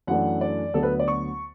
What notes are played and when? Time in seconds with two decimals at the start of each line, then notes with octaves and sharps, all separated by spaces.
0.07 F#2 E3 A3 D4 F#5
0.41 D5
0.74 D2 D3 F#3 B3 A4
0.83 B4
1.00 D5
1.08 C#6